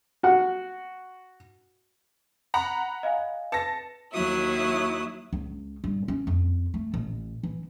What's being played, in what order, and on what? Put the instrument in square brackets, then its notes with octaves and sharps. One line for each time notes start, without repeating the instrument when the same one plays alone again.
[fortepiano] F#4 F#5
[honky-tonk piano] F#5 A#5 B5
[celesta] D#5 F5 G#5
[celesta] B4 C#7 [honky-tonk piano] A5 A#6
[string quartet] D#2 F#3 E4 D#6
[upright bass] C#2
G2
C#4
F2
A3
A1
E3